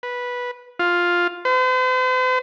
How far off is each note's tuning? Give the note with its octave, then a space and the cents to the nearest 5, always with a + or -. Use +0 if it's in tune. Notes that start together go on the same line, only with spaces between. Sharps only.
B4 -10
F4 +5
C5 -45